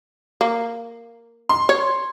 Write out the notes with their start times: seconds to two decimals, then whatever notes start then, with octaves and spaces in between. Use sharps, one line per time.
0.41 A#3
1.49 C6
1.69 C#5